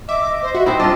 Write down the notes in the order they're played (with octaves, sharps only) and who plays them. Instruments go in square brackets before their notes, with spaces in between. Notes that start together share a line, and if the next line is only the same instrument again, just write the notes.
[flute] D#5 [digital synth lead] E5 [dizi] D6
[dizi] C5
[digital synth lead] F#4 [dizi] E5
[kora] C4 D#4 E4 [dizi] C5
[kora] D4 F4 [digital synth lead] D#5 [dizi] A5